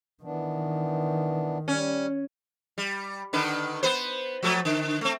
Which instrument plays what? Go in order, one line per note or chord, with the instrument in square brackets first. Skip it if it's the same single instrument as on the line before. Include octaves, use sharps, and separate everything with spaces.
[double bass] D#3 [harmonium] E3 B3 D4
[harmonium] G3 [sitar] C#4
[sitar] G3
D3 D#3 B4
B3 B4 C5
F3 F#3 A3
D3
A3 C4